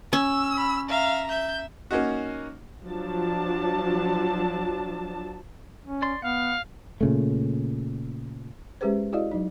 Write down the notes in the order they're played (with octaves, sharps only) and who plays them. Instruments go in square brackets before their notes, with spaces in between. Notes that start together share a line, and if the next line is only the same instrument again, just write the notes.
[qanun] C#4 [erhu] E6
[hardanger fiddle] B5
[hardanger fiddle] E5 A#5 [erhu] F5
[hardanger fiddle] E5 [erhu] G6
[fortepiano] A#3 C#4 D#4 F#4
[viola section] F3 F#3 D4 A5
[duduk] C#4
[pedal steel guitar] D5 C6
[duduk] B3 [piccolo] F5 [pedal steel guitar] F#5
[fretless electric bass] A#2 C#3 A3
[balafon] G#3 C#4 G4 G#4 B4 C5
E4 F#4 G#4 D5 D#5 F5
F#3 D#4